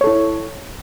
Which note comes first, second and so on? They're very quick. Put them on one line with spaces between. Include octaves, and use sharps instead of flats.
C#5 A4 E4